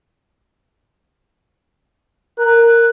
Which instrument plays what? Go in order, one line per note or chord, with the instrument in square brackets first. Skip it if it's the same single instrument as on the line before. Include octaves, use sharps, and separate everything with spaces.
[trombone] A#4 [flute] F#6